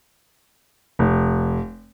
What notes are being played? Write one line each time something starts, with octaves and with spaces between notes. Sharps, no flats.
F1